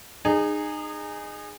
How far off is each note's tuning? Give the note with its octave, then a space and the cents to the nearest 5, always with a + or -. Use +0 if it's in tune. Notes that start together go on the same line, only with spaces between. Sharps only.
D#4 -30 G#4 -10